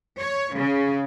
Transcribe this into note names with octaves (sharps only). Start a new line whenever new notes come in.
C#5
C#3